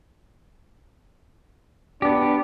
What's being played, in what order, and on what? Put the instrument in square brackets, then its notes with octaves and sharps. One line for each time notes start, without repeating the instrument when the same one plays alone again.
[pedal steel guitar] B3 G4 [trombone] D4